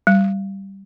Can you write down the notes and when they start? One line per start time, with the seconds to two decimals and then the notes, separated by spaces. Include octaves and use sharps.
0.07 G3